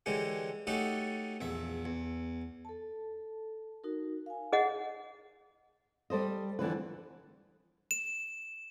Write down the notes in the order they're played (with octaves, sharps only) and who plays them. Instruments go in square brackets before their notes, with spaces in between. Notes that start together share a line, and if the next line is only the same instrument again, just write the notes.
[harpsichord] D3 E3 G#3 C#4 G4
A3 C#4 D#4 F#4 G4 A4
A#1 E2 E5
E2
[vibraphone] A4 A5
D#4 F#4 A#4
F5 G#5
[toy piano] G#4 D#5 F#5
[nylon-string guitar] G3 A4 C5 D#5
F2 D3 E3 B4
[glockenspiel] E7